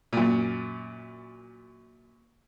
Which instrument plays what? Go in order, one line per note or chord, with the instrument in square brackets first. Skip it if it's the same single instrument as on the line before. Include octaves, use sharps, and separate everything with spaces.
[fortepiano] F#2 A#2